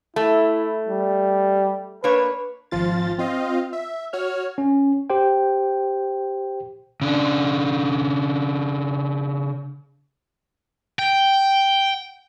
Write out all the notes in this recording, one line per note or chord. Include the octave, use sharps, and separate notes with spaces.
A3 E4
G3
A#3 D4 B4 C#5
G#1 F3 F4 A6
C4 F4 D#5 F5
E5
F#4 C#5 F6
C#4
G4 C5 G5
C#3 D4
G5